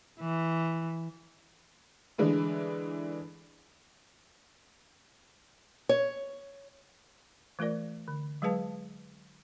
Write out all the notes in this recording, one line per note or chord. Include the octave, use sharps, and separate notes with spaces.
E3
D3 E3 G#3 D4
C#5
E3 A3 F4 A#4 D5
D3
F#3 G#3 G#4 B4 F5 A5